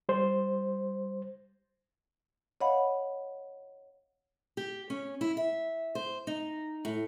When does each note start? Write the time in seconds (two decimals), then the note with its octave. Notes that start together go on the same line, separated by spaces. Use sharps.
0.09 G3 C5
2.61 C#5 D#5 F5 F#5 B5
4.57 G4
4.90 C#4
5.21 E4
5.37 E5
5.95 C5
6.27 D#4
6.85 A2